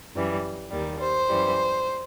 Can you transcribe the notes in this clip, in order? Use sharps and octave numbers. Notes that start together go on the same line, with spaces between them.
F#2 E3 G3
D#2 D#3 G3
C5
F#2 E3 G3